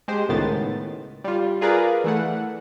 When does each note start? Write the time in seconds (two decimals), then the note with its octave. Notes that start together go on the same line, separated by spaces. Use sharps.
0.08 G#3 G4 C5
0.29 C#2 A2 D#3 B3 A6
1.24 G3 F4
1.61 F4 G#4 A#4 B4 D5 F5
2.04 E3 A3 F#5